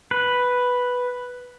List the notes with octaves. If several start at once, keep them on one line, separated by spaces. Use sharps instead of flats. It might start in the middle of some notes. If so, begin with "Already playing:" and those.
B4